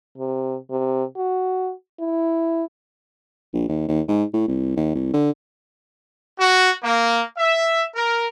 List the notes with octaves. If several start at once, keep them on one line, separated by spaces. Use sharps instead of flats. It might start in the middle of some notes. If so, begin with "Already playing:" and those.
C3
C3
F#4
E4
A#1
D#2
D#2
G#2
A2
C2
D#2
C2
D3
F#4
A#3
E5
A#4